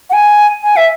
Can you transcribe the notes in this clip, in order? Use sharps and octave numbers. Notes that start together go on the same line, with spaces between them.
F#5
G#5
G#5
E5